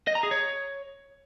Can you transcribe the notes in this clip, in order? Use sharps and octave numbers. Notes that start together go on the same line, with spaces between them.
D#5
A#5
G#4
C#5